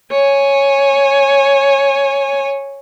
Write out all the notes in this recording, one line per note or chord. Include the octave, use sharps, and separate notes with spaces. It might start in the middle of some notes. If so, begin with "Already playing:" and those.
C#5 G#5